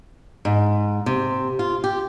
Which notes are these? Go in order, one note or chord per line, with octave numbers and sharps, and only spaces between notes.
G#2
C3
F4
G4